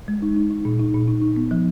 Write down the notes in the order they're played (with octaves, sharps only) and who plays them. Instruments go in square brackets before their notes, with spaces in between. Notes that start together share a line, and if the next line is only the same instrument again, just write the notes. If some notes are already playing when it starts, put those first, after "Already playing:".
[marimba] G#3
D#4
D#4
D#4
A#2
D#4
A#2
D#4
D#4
B3
F3